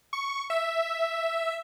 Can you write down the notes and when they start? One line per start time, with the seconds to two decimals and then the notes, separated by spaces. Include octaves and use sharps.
0.13 C#6
0.50 E5